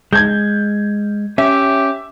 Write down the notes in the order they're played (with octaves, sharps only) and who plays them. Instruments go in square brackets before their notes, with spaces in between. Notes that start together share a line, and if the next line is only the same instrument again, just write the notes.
[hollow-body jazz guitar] G#3 [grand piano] G6 G#6
[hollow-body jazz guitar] C#4 [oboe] G4 [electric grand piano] E5